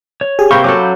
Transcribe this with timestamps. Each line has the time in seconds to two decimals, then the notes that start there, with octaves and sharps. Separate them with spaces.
0.21 C#5
0.39 G4 G#4 G#5
0.51 C3 A#3 C4 G4 F5 B5 C#6 G6
0.64 F#3 C#4 F#4 A4 D6